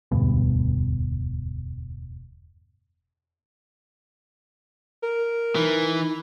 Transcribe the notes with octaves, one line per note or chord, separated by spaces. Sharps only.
E1 D2 G2 B2
A#4
E3 D#4